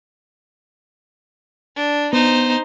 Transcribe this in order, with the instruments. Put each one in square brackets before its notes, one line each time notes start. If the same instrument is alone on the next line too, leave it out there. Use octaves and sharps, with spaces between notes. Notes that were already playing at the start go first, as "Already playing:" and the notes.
[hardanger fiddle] D4
[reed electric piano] B3 [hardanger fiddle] D#4 C5